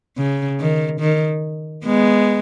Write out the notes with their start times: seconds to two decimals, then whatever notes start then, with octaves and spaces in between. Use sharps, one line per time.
0.17 C#3
0.59 D#3
1.01 D#3
1.85 G#3 B3